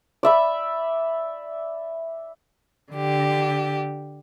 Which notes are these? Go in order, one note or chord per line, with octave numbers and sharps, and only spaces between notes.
D5 E5 B5
D3 G4